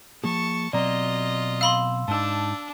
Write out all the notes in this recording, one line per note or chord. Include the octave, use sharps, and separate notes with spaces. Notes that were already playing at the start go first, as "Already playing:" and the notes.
F3 A#3 G#4 A5 C#6
B2 F#3 C4 F4 D5 D#5 A#5
F5 B5 C6 E6
G#2 D4 D#4 A5 E6